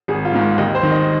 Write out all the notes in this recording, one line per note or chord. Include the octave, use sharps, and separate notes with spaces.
G#1 G#4
F4
G#2 D#3
D#2 D#5
C5
D#3
D#5